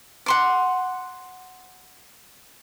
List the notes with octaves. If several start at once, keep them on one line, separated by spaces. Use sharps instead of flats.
F#5 C6 D6